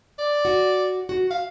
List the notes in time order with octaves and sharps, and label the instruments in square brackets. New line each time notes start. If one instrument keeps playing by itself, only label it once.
[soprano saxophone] D5
[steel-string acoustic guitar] F#4
F#4
[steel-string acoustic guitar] E5 [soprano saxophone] F5